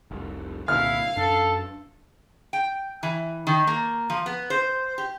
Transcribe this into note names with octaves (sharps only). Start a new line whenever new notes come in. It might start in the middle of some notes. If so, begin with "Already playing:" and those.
F1 C2
C2 A#2 D3 E4 F5 F6
F#2 D4 A4
G5
E3
D#3
A#3
F3
B3
C5
G4